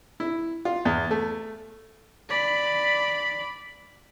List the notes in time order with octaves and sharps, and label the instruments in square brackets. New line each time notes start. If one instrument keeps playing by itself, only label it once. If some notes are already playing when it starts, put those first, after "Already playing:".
[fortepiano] E4
F4
E2
A3
[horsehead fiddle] D5 B5